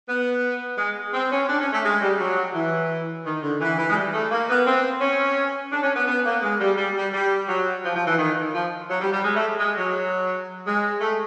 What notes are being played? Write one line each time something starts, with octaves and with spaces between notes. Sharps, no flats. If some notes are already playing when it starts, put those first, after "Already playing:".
B3
G#3
C4
C#4
D4
C#4
A3
G#3
G3
F#3
E3
D#3
D3
E3
E3
G#3
G3
A3
A#3
B3
C4
C#4
D4
C#4
B3
B3
A#3
G#3
G3
G3
G3
G3
F#3
F3
F3
E3
D#3
F3
F#3
G3
G3
G#3
A3
G#3
F#3
G#3
A3